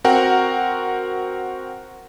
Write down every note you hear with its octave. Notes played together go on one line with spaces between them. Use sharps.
C4 F#4 A#4 F#5 G5